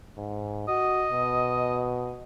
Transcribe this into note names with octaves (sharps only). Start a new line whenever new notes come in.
G#2
F#4 D#5
B2